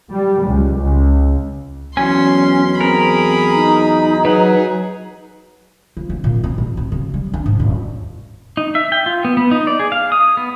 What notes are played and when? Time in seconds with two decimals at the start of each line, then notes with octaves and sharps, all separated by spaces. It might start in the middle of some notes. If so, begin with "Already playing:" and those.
0.13 G3
0.46 C#2
0.78 C#2
1.97 E2 F#3 C#4 G#5 C6
2.81 C4 G#4 A#4 B5
3.54 D#4
4.25 F#3 G#4 B4
5.97 F3
6.09 D3
6.24 A#2
6.44 C4
6.58 A#1
6.77 A1
6.92 C#3
7.14 G3
7.34 D4
7.46 G#2
7.60 D#1
8.57 D#4
8.75 E5
8.92 G5
9.06 F4
9.25 B3
9.37 B3
9.51 D#4
9.67 D5
9.79 G#4
9.92 F5
10.12 D#6
10.37 B3